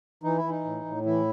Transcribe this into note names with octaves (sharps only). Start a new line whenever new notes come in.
E3 D#4
E4
E3
D#4
A2
A2
E3 E4